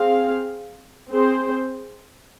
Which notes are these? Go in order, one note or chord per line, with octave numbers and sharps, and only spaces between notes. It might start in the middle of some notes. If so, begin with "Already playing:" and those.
Already playing: C4 G#4 F5
C4 G#4 C5